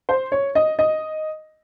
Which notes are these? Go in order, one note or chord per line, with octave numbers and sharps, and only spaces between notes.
C5
C#5
D#5
D#5